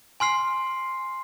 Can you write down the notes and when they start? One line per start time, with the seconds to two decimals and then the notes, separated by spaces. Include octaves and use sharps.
0.20 G#5 C6 F6 C7